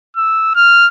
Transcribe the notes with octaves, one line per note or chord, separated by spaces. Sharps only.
E6
F6